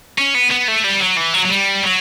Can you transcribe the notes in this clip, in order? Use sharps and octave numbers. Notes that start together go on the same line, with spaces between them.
C#4
B3
B3
A3
G3
F#3
E3
F#3
F#3
G3
F#3